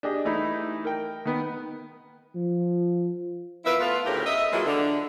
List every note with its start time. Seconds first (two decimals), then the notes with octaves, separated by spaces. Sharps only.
0.03 D4 G4 G#4 D#5
0.25 E3 A3 D#4 E4
0.85 A#4 G5
1.25 D#3 B3
2.35 F3
3.65 B3 E4 F4 A#4 B4 E5
3.80 A3 B3 F4
4.06 D2 A2 C#3 E4 G4 A#4
4.25 D#5 E5
4.52 E3 F#3 G#3 A#3 E4 F4
4.66 D3